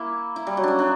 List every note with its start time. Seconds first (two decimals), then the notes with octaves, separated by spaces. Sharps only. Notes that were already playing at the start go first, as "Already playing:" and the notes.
Already playing: A#3 E4
0.36 E4
0.47 G3
0.57 F#3
0.63 C#4 D4
0.79 D4